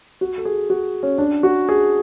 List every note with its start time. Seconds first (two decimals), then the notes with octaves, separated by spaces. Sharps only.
0.21 F#4
0.38 A4
0.45 G#4
0.70 F#4
1.03 C#4
1.18 D4
1.43 F#4
1.69 G#4